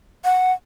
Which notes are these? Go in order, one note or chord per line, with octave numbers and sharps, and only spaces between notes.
F#5